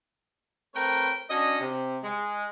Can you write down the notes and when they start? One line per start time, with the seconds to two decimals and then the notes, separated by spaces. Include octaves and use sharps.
0.75 A3 C4 A#4 B4 C#5 G5
1.30 C#4 D4 F#4 D#5
1.60 C3
2.03 G#3